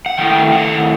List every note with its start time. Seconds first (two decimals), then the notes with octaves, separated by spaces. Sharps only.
0.06 F#5
0.17 D#3 A3 E4 G5
0.52 F#5